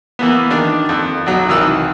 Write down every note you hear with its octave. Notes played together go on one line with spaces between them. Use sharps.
E3 A#3 B3
D#3 D4 D5 D6
F2
B1 F#3
C2 D#3 E3 E6